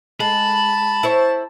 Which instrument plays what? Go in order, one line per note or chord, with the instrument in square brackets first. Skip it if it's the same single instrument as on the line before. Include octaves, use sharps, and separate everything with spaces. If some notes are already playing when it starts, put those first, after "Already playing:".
[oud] G#3 [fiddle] A5 [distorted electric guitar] B5
[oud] E4 C5 C#5